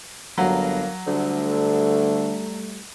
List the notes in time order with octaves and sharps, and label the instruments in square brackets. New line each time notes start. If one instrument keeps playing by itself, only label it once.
[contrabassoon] G1 [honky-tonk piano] F#3 [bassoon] A#3
[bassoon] D2 [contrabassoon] D3 [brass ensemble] G3 A3